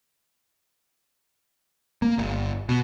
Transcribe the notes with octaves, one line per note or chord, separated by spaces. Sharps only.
A#3
G1
B2